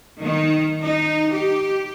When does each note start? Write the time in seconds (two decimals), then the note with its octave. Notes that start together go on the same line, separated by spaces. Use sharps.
0.22 D#3
0.81 D#4
1.31 G4